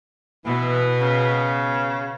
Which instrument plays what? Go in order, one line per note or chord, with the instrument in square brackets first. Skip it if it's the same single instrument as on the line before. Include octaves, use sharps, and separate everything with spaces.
[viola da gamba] B2 B3 [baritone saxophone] E3
[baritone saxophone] C#3